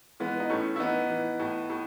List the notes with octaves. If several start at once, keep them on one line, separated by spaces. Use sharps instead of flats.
E3 G#3 B3
D#4
A2 A3 C#4
E4
E3 B3 D#4
E3
A2
A2